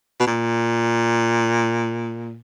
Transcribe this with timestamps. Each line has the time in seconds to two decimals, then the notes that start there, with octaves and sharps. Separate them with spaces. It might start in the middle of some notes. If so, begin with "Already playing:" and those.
0.20 B2
0.27 A#2